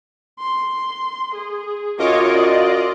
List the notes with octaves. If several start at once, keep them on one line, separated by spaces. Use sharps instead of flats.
C6
G#4
F#2 F4 C#5 D#5 D6
D5